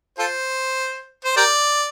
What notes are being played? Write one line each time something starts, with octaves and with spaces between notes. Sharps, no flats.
F4 A4 C5
C5
G4 A#4 D5